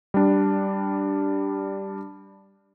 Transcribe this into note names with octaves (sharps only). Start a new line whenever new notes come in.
G3 D4